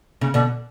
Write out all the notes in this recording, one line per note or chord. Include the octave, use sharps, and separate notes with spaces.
C#3
B2 D3